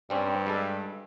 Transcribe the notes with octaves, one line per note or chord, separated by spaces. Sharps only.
G2 G3 C4 C#4
G3 G#3 A4